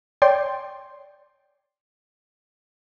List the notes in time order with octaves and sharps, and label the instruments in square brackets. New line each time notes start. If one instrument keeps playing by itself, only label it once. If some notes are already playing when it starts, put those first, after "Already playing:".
[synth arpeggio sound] C#5 D5 G5 C6